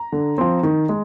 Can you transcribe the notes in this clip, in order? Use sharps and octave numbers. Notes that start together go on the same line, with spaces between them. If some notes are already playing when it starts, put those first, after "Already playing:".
Already playing: A#5
D3
F3 C4
D#3
G#3